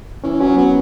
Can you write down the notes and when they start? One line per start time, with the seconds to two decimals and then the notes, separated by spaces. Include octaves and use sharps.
0.24 E3 C#4
0.40 F#3 C#4
0.57 F#3 B3